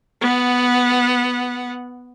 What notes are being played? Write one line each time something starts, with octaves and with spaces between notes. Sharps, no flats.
B3 F#5